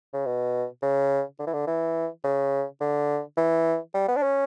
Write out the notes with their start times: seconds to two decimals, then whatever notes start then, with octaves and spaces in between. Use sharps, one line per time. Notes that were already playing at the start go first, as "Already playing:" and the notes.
0.14 C#3
0.26 B2
0.82 C#3
1.39 D3
1.47 E3
1.54 D3
1.67 E3
2.24 C#3
2.81 D3
3.37 E3
3.94 G3
4.08 B3
4.17 D4
4.23 C#4